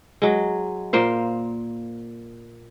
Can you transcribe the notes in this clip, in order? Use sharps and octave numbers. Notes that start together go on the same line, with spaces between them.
F#3 G#3
A#2 A#3 C5 F5